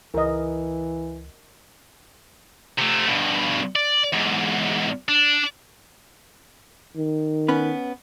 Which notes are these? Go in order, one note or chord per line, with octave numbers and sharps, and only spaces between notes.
C#2 E3 A#4 D#5
C3 A3
G2 B2
D5
E2 G#2
D4
D#3
B3 C#4 B4